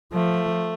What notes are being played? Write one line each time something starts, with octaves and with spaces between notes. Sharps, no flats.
F3 A3